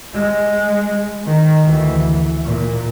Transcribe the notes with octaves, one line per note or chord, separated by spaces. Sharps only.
G#3
D#3
D2 E3
A#2